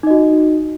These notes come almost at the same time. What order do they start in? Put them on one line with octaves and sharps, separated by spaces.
D#4 D#5 F#4